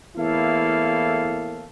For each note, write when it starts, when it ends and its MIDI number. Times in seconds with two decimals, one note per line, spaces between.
0.16 1.66 40
0.16 1.66 45
0.16 1.66 58
0.16 1.66 64
0.16 1.66 69
0.16 1.66 77